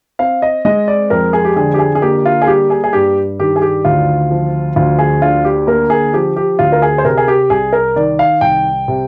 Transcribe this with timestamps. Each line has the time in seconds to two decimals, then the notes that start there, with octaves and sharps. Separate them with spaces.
0.19 C4 F5
0.42 D#5
0.65 G#3 D#5
0.88 D5
1.10 F2 A#4
1.33 G#4
1.45 G4
1.56 D3 G#4
1.74 G4
1.79 G#4
1.95 G#4
2.02 A#3 G4
2.26 F4
2.42 G#4
2.47 G3 G4
2.70 G#4
2.84 G#4
2.93 G2 G4
3.39 D#3 G4
3.56 G#4
3.62 G4
3.85 D2 F4
4.31 F3
4.76 D2 F4
4.99 G#4
5.22 D3 F4
5.45 G4
5.67 A#3 A#4
5.90 G#4
6.14 F3 G4
6.36 G4
6.59 D2 F4
6.72 A#4
6.82 G#4
6.98 C5
7.04 C3 A#4
7.17 G#4
7.28 G4
7.50 C2 G#4
7.73 A#4
7.96 D#3 D5
8.19 F5
8.41 C2 G5
8.88 C3